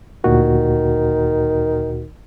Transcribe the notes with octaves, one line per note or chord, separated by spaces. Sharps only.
D2 A#2 D#3 F#4